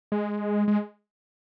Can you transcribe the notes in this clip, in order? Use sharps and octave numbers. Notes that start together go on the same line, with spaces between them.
G#3
G#3